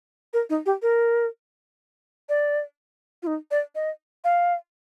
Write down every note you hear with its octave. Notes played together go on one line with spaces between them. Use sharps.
A#4
D#4
G4
A#4
D5
F4
D#4
D5
D#5
F5